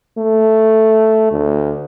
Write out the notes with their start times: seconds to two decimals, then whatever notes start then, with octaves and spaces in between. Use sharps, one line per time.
0.18 A3
1.31 D2